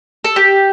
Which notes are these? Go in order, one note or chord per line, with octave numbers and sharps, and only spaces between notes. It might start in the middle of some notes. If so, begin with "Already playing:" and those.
A4
G4